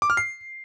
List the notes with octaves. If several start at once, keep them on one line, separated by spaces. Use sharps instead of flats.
D6
F6
C7